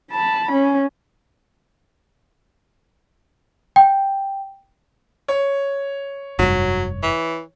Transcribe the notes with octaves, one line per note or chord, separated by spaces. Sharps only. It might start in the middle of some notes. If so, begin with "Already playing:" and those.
A5 B5
C#4
G5
C#5
F1 G2 F#3
E3